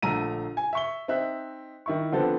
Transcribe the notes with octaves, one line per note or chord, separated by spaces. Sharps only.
A#1 D3 A3 A#5 E6 D#7
G#5
E5 C#6 G7
C4 D#4 E5 F#6
D#3 E4 C#6
D3 F3 B3 C4 A4